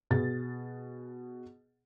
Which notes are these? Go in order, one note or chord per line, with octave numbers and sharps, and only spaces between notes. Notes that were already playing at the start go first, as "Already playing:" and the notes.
B2 G#4 A6